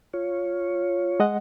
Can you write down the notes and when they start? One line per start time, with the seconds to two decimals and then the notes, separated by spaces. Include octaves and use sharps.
0.14 F4 C#5
1.20 G#3 D#5 F#5